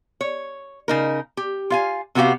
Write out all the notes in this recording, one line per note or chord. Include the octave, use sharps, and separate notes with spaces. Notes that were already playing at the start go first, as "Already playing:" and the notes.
C#5
C#3 D#4 A#4
G4
F4 F5 G#5
C3 B3 F#4 G4 F5